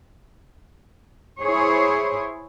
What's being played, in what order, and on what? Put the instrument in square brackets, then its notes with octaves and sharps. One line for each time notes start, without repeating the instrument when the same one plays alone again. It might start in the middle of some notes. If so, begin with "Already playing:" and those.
[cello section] E4 G#4 C5 C#5